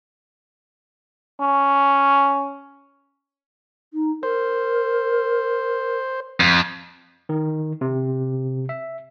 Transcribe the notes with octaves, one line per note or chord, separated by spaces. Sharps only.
C#4
D#4
A#4 C5
F2
D#3
C3
E5